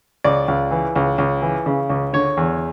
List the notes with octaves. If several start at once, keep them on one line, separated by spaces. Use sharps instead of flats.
C#2 D5
C#2
E3
C#2
C#2
E3
C#3
C#2
D3 C#5
E2